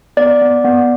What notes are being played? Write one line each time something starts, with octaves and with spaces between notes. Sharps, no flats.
B3 D5
B3
B3